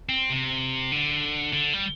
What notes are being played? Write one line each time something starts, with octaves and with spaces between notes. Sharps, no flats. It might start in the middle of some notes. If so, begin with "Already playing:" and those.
C4
C3
D3
D3
G3